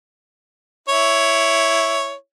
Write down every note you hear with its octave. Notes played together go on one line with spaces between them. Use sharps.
E4 C#5